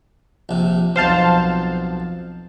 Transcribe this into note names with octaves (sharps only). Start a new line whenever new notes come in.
A#1 C3
B1 F2 C5 F5 A5